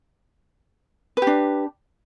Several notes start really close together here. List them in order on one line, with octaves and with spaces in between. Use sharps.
B4 G4 D4